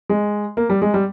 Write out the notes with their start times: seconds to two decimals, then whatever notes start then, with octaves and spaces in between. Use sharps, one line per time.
0.09 G#3
0.57 A#3
0.70 G3
0.82 G#3
0.94 G3